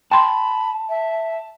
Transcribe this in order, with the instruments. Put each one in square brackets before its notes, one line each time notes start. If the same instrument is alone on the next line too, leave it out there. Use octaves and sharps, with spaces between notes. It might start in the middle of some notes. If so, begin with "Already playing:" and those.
[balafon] G5 C6 [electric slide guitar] A5 [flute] B5
[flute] E5